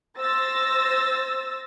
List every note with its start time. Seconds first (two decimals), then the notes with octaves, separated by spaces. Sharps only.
0.20 C5 E6 A6 A#6